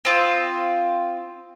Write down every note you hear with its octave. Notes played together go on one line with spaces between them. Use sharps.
C4 F4 D#6